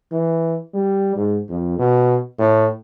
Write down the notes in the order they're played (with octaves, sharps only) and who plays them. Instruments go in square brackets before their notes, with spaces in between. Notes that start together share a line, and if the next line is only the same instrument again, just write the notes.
[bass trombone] E3
G3
G#2
F2
B2
A2